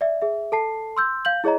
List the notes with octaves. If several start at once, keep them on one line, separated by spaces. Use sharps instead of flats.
D5 E5
G#4 E5
A4 A5 C7
C6 E6 G6
F5 G6 F#7
E4 G#4 C#5 D#5 A#5